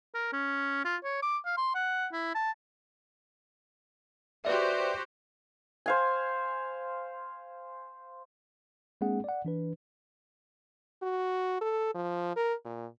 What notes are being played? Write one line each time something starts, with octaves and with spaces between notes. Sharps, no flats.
A#4
C#4
F4
C#5
D6
F5
C6
F#5
E4
A5
F#4 G4 B4 C5 D5 E5
C5 F5 G#5
G#3 A#3 C4 D4 G#4 F#5
D5 F#5
E3 D4 B4
F#4
A4
F3
A#4
A#2